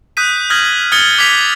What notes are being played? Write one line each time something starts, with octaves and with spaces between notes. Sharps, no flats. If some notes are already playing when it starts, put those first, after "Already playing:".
D#6 F#6 G6 B6 D#7
D#6 F6 G6 G#6 A#6 F#7
D#6 F6 G#6 A6 C#7 G7
D6 F6 G#6 B6 F7